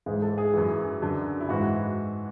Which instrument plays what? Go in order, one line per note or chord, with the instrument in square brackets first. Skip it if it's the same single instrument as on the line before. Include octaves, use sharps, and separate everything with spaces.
[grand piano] G#2 E3 G#4
A4
G#4
F#2 E3
F#2 D3
E4
G#2 E3 F#4